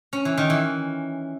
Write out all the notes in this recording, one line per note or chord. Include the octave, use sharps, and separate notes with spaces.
C#4
E3
D#3
E3